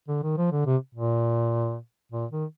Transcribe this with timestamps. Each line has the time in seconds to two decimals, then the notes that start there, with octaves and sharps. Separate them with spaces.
0.08 D3
0.23 D#3
0.37 F3
0.52 D3
0.66 C3
0.95 A#2
2.12 A#2
2.31 D#3